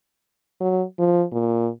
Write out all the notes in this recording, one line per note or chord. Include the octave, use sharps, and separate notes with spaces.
F#3
F3
A#2